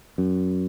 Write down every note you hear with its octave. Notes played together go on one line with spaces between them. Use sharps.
F#2